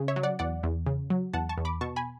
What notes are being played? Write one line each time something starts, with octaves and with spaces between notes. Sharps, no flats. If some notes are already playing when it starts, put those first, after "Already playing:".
Already playing: C#3
C#5 E5
F#3
D5 F#5
E2 D5 F#5
E2
C#3
F#3
E2 F#5 A5
A5 C#6
E2
B5 D6
B2 A5 C#6
G#5 B5